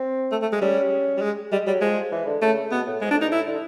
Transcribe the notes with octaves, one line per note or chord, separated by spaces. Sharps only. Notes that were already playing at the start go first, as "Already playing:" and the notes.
Already playing: C4
A3
A3
G#3
G3 C#4
G3
G#3
G3 G#3
F#3 G3
F3 G#3
E3
D3
C#3 A3
B2 B3
A2
G#2 G#3
F2 D4
G2 D#4
A2 E4
D3